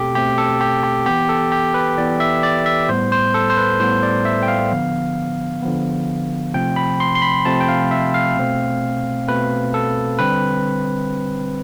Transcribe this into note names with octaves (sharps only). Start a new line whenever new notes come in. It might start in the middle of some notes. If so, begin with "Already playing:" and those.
Already playing: B2 A3 C4 G4 A4
B2 A3 C4 G4
A4
G4
G4
E3 B3 G4
A4
G4
B4
E3 B3 D5
E5
D5
E5
A2 G3 B3 C5
C5
A4
C5
B4
A2 G3 B3 C5
D5
E5
G5
F5
D3 F3 B3
D3 F3 B3
C3 F3 A3 C4 G5
B5
C6
C6
B5
C3 F3 A3 C4 A5
G5
F5
E5
F5
B2 A3 C4
B2 A3 C4 B4
A4
D3 G3 C4 B4